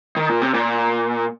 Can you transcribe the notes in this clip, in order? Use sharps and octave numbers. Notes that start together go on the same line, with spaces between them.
D#3
A#2
C3
A#2